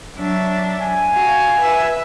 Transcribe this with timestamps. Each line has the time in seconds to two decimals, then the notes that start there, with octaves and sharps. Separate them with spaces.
0.16 F#3 D4 E5
0.82 G#5
1.12 F#4 F5
1.58 B4 E5